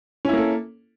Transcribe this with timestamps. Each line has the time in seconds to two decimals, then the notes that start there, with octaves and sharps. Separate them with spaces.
0.25 C#4
0.29 E4
0.33 A#3
0.38 A4